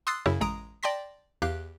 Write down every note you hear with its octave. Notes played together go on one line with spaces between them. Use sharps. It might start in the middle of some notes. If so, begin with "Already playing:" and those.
C6 D#6 E6 F#6 A6 C7
F#2 C#3 E4
A1 G#3 A#5 D#6 D7
D5 G5 A5 C6 A#6 B6
E2 G4 F5 F#6